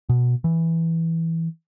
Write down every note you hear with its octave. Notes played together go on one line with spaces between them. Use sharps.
B2
E3